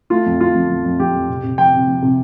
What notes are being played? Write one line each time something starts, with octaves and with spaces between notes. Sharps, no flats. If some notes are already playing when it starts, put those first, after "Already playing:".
A3 F4
F2
F3 F4
F3
F2
F2
F3 G4
F2
C3
C3
F3 G5
C3
F3
C3